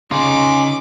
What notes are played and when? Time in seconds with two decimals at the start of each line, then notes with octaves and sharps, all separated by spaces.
0.11 C#3 D#4 F4 G#4 C6 D6